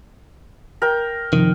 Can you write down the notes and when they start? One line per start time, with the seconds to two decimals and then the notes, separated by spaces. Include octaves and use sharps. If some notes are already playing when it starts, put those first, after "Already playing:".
0.82 A#4 G5
1.33 F#2 C3 D#3 F3